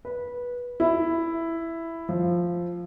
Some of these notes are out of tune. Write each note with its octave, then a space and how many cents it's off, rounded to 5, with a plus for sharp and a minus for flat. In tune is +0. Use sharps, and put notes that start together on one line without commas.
B4 -15
E4 +5
F3 +0